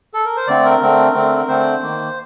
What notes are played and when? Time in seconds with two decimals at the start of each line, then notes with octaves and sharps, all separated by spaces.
0.14 A4
0.25 A#4
0.37 C5
0.47 D3 A3 C4 D5
0.65 A#4
0.81 D3 A3 C4
1.14 D3 A3 C4
1.48 D3 A3 C4 C5
1.82 D#3 A#3